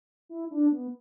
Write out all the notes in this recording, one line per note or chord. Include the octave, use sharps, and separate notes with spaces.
E4
D4
B3